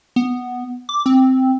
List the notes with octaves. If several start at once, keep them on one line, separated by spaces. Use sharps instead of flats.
B3
D6
C4